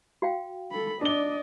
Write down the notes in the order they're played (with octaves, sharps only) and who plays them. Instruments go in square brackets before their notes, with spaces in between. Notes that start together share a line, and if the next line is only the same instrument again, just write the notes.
[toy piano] F#4 F5 G5
[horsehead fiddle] A4 B5
[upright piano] D4 G7 [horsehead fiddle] D5 D#5